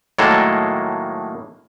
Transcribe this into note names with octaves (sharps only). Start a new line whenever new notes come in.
A2 D#3 F#3 G#3 A#3 A4